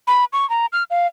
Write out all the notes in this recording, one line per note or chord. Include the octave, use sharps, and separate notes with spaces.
B5
C#6
A#5
F6
F5